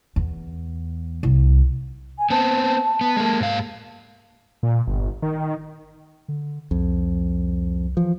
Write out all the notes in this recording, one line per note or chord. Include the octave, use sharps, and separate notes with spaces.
E2
C2
G#5
B3 C4 A5
B3
G#3 A#3
G#2 F5
A#2
G1
D#3
D3
C2 F2
E3 F3